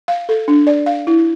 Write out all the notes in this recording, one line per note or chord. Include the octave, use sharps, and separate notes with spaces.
F5
A4
D4
D5
F5
E4